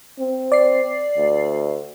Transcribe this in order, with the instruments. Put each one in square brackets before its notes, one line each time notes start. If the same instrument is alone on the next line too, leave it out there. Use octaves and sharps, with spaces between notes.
[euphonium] C4
[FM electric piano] D5 C7
[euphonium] D2